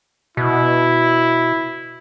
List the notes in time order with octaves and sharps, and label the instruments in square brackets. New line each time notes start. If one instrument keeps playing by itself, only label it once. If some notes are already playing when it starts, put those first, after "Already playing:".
[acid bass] B2 [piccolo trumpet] E4